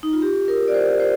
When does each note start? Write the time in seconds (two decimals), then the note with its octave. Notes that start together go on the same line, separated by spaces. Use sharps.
0.03 D#4
0.13 F4
0.22 G4
0.48 A#4
0.68 D5
0.74 C5
1.00 C5